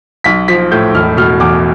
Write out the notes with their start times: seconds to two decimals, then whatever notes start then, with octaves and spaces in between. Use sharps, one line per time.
0.24 B1 B6
0.48 F3 B6
0.72 A2 G6
0.94 E1 F6
1.17 B2 F6
1.40 E2 D6